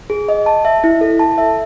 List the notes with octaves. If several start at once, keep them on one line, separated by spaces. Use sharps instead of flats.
G#4
D#5
A5
E5
E4
A4
A5
E5